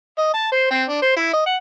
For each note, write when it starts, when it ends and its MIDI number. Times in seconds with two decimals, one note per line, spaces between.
0.18 0.29 75
0.34 0.50 81
0.52 0.68 72
0.71 0.84 60
0.89 1.00 62
1.02 1.15 72
1.17 1.33 64
1.33 1.43 75
1.46 1.56 78